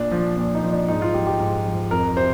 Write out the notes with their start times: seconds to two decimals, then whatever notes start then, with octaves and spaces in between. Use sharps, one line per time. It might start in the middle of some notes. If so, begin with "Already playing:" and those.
Already playing: A#2 D4
0.11 F3
0.37 A#2
0.55 D#4
0.63 F3
0.71 D4
0.88 G#2 D#4
1.02 F4
1.14 F3 G4
1.27 G4
1.40 G#2
1.66 F3
1.91 F2 A#4
2.17 C3 C5